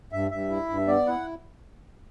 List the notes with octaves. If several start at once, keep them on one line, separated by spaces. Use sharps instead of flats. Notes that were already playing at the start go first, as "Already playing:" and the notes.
G2 E5
G2 E5
E4
G2
B3 D5
E4 F#5